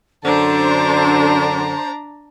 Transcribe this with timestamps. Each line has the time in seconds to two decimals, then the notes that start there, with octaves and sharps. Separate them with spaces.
0.24 F#2 D3 D4 C5 A5 A#5